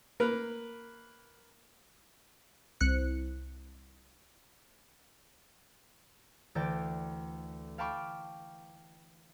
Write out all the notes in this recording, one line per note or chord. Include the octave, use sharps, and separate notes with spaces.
A#3 A#4 B4
C2 F#6 C#7
D2 E3 D5 G5 A5
F5 G5 A5 B5 C#6 D6